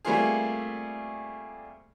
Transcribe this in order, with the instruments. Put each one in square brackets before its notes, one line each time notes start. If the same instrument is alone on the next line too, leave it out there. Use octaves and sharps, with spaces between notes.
[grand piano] G3 A3 A#3 C4 F4 G#4